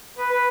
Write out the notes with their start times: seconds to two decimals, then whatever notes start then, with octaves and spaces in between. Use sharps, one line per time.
0.18 B4
0.31 B4